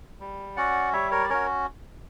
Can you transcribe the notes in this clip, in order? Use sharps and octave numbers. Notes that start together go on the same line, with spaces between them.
G3
C#4 F#4 D5 F#5
G3 C#5 E5
A#4 C#5
D5
C#4 F#4 A#4 C#5